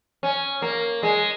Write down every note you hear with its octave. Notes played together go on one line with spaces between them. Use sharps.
C#4
A#3
G#3